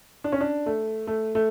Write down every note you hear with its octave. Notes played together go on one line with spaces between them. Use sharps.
D4
C#4
D4
A3
A3
A3